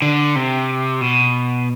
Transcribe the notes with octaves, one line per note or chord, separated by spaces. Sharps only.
D3
C3
B2